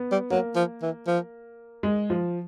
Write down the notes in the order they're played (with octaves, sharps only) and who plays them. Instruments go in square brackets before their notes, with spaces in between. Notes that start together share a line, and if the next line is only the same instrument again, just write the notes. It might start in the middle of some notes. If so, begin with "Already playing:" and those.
Already playing: [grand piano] B3
[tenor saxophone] G3
[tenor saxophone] F#3 [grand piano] A#3
[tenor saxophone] F3
E3
F3
[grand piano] G#3
F3